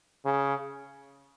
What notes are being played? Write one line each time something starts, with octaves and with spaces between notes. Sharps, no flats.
C#3